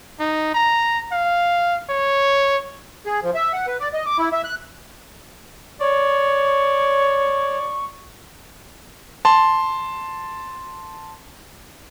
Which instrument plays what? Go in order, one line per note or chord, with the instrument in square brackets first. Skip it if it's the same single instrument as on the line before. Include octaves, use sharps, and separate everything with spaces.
[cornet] D#4
A#5
F5
C#5
[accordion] G#4
F3
E5
F#5
B4
D5
D#5
D6
E4
E5
F#6
[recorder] C#5 [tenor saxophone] D5 [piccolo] C#6
[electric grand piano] A5 C6